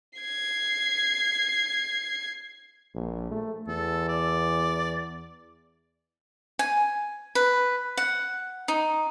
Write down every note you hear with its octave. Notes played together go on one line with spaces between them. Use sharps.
G#6 C7
A#1
A3
E2 A4
D5
G#5
B4
F#5
D#4